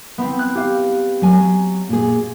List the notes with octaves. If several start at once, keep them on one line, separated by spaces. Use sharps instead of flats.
B3 C4
F#6
G4 F5
F#3 G#5
A#2 G#4